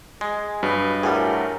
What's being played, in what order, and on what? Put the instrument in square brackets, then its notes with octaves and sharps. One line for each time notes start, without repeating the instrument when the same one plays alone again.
[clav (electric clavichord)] G#3 [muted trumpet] G#4
[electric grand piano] G2 [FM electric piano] F#3 D#5 [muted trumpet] B4
[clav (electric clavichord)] A2 G3 [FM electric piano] F#4 G#4 [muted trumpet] A#4